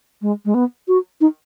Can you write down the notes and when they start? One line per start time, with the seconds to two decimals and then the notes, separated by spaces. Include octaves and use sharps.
0.22 G#3
0.45 G#3
0.54 B3
0.88 F#4
1.21 D#4